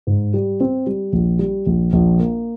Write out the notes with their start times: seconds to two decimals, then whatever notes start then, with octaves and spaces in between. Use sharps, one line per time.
0.07 G#2
0.34 G3
0.60 C4
0.87 G3
1.13 A#1
1.39 G3
1.66 A#1
1.93 A#1
2.20 A#3